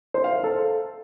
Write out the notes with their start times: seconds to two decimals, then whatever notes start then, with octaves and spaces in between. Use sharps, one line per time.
0.14 C5
0.24 F5
0.34 C5
0.44 A4